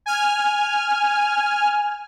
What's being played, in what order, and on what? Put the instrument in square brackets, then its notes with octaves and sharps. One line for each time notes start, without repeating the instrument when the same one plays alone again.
[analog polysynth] G#5 F6